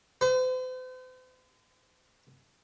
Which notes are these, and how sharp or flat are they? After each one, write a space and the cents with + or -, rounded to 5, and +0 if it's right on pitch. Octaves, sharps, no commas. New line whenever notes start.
C5 -45